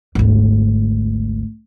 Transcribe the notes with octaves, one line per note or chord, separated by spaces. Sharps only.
G#1 D2